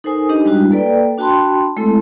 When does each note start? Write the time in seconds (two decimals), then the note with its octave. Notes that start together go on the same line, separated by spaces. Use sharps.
0.04 D#4 A4 A#4 C5 G#5 D#6
0.29 D4 D#4 G4 C5 D#5
0.45 G3 G#3 D4 E4 F#4
0.72 A#3 A4 B4 D5 G5
1.18 D4 F#4 G5 A5 B5 C6
1.76 G#3 A3 C4 E4 A4